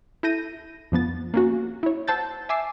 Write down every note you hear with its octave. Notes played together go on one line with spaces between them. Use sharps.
E4 A4 G6 A#6 D#7
F2 F3 B3 A6
A#3 C#4 F#4
E4 C#5
C5 F#5 A5 E6 G6 A6
E5 G#5 D6 E6 C7